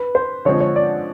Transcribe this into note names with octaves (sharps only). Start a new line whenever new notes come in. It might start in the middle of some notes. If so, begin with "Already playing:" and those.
Already playing: B4
C5
D3 F3 G#3 C4 C#5
C#5
D5